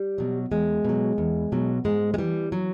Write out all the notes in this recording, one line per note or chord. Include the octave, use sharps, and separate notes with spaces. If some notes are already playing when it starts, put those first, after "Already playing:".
Already playing: G3
B2 F#3
E2 G#3
B2 F#3
E2
B2 F#3
G#2 G#3
G#3
E3 G3
F#3